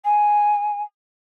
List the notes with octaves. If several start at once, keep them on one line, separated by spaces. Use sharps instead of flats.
G#5